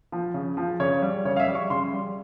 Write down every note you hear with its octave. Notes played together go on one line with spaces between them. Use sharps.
F3
C#3
F3
C#3 C#5
G3
C#3 C#5
F5
E5
G3
C#6
C#3 C6
G3